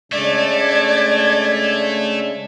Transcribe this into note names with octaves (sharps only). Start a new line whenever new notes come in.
C#3 G#3 A3 D4 D5 G#6